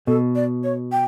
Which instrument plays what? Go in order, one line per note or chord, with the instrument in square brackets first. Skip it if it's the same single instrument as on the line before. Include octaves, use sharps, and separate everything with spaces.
[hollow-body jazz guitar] B2 [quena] A4
[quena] D5
C#5
G5